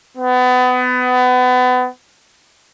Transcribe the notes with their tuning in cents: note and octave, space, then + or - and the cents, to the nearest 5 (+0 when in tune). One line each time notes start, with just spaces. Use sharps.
B3 +30